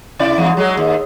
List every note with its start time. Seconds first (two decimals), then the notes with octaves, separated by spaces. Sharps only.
0.19 C3 E4 D5
0.38 E2 G#2
0.57 F#3 G#3
0.77 D#2